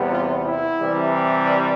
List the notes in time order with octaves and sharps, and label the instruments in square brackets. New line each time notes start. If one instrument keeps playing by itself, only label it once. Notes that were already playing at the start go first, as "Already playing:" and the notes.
Already playing: [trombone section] E2 C3 G3 B3
F4
E4
C3 E3 G3